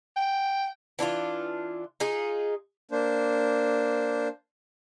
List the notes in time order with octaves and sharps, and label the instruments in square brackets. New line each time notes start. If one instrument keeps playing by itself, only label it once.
[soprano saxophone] G5
[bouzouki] E3 D4 E4 F4
D#4 F4 G#4
[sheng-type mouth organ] A#3 D4 C5